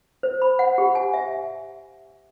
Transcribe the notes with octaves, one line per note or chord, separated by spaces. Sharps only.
C5
B5
F#5
G4
G#5
E5